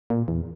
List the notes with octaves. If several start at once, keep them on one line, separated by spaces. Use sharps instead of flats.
A#2
E2